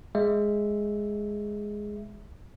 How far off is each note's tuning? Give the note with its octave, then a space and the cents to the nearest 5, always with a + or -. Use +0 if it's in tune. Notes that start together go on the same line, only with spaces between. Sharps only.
G#3 +0 E5 +0